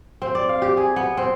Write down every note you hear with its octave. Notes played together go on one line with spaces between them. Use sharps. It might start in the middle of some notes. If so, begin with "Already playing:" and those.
C4
D5
F5
G4
G#4
B3
C4